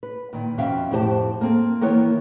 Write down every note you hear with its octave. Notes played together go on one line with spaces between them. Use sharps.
B4
A#2 D#3
F2 B2 C#4 E5 F5 G5
F2 A2 C4 G4 C5 A5
A#3 C4 A4
D#3 E3 A#3 B3 B4 C#5